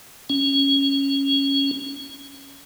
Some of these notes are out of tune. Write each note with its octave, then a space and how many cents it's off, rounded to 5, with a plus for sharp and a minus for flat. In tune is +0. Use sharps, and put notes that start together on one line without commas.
C#4 -5